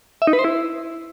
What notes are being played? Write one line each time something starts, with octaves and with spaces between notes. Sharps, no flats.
E5
D#4
B4
C5
E4